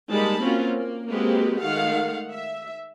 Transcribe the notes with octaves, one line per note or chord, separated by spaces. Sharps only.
G3 G#3 A#3 D#4 A5 B5
A#3 C4 C#4 F4 F#4
A#3
G#3 A#3 C4 F#4 G4 B4
D#3 G#3 A3 F5 F#5
E5